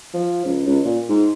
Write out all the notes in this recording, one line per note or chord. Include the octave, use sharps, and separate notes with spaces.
F3
C#2
C#2
A#2
G#2